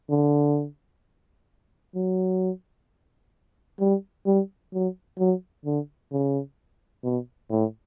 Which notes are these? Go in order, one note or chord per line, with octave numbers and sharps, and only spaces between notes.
D3
F#3
G3
G3
F#3
F#3
D3
C#3
B2
A2